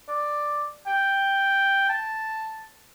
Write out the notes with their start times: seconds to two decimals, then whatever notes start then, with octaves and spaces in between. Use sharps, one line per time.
0.09 D5
0.87 G5
1.89 A5